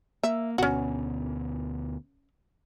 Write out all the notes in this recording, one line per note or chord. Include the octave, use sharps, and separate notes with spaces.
A#3 E5
D2 B2 B3 C#4 F#4